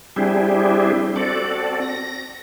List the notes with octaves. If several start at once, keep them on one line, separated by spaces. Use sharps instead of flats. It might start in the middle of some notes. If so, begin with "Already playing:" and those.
G3 C4 D4 E4 G4 G#4
C4 F#4 A4 D5
A#6